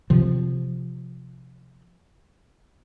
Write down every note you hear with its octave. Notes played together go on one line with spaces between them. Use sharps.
C3 F3